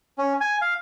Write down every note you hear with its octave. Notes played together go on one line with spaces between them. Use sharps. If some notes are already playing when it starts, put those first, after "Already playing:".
C#4
G#5
F5